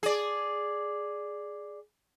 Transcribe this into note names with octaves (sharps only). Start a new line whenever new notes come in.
G#4 D5